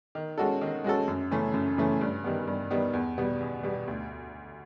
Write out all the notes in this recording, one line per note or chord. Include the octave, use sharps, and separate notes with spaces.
D#3
G#3 C#4 F#4 A4
D#3
G#3 C#4 F#4 A4
F#2
C#3 E3 A3 C#4
F#2
C#3 E3 A3 C#4
G2
D#3 G3 B3
G2
D#3 G3 B3
E2
B2 G3 B3
E2
B2 G3 B3
D2